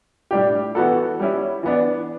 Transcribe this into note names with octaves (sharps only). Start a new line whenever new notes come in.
A2 G3 D4 G4
E3 B3 F#4 A4
G3 C#4 E4
E3 B3 D4